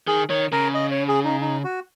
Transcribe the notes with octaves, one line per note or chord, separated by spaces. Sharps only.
D#3 G#4
D#3 C#5
C#3 A#4
D#5
C#5
G#4
D#4
D#4
F#4